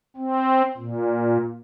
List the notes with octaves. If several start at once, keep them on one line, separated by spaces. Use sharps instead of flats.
C4
A#2